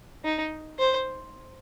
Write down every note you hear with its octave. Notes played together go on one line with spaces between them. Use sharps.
D#4
C5